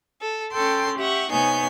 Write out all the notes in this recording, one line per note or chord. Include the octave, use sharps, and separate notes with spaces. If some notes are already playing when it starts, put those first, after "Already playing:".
A4
C#4 A4 G5 C6
G4 E5 F#5 C#6
C3 B3 D#4 C#5 G#5 G6